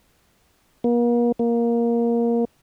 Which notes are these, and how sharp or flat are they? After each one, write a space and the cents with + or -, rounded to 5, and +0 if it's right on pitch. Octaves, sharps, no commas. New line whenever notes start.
A#3 +40
A#3 +10